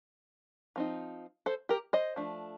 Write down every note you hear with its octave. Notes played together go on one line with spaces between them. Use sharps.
F3 C4 D#4
A4 C5
G4 A#4
C5 D#5
F3 A3 D4